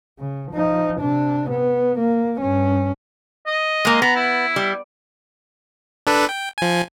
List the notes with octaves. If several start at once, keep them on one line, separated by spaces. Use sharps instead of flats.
C#3
F3 D#4
C3 D4
B3
A#3
G2 C#4
D#5
G#3 A#3
B3 A#5
E4
G3
D4 A4 B4
G5
F3 G#5